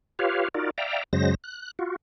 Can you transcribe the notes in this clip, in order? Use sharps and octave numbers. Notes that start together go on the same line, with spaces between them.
F4 G4 B4 C#5 F5
D#4 F4 F#4 A#4 D5
D5 E5 F5 G5 A#5
F#2 C#3 F#3 G#3 C5 A#6
F#6
F4 F#4